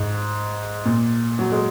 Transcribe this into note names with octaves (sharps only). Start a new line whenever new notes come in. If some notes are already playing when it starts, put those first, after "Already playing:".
Already playing: G#2
A#2
F#3
G#3